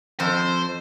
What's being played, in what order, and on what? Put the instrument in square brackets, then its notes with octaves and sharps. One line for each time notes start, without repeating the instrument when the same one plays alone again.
[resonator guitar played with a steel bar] F2 [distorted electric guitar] C5